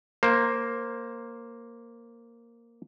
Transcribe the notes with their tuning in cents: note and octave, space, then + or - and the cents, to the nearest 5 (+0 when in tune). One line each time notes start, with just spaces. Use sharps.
A#3 +0 C5 +10